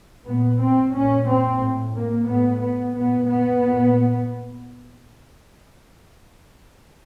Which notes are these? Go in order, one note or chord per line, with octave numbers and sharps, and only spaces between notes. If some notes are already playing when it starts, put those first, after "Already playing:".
A#2 B3
C4
A#2 C#4
C4
A2
A#3
A2 B3
B3
A#2 B3
B3
A#2